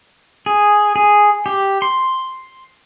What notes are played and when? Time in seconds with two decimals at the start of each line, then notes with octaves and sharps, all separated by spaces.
0.46 G#4
0.96 G#4
1.46 G4
1.82 C6